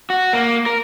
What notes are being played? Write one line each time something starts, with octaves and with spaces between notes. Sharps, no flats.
F#4
A#3
A#4